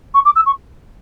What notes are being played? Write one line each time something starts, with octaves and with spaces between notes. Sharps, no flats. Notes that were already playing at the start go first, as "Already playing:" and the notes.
C#6
D6
E6
C#6